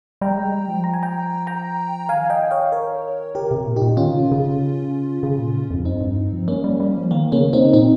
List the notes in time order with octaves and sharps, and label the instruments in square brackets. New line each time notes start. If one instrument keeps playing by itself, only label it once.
[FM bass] G3 [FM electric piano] G5 A#5
[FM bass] G#3
G3
F3
[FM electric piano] A#5
G#5
G5 A#5
G5 A#5
[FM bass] D#3 [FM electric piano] F5 G#5
[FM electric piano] D#5 G5
C#5 F5
A#4 C#5
[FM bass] C#3 [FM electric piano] G4 A#4
[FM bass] C3
A#2
[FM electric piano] D#4 G4
[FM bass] A#2
[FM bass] D#3 [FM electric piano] C#4 F4
[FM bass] C#3
C3
C#3
C#3
A#2
G#2
F2
[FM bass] G2 [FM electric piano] C4 D#4
[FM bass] G2
G#2
F3
[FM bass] G3 [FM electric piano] A#3 C#4
[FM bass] G3
G3
F3
[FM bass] D#3 [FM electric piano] A#3
[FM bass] C#3 [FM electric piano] A#3 C#4
[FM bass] C3 [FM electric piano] C4 D#4
[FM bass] A#2 [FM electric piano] C4 D#4